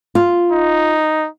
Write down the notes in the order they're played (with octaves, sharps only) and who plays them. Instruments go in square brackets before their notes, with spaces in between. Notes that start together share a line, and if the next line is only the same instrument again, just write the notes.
[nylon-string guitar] F4
[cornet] D#4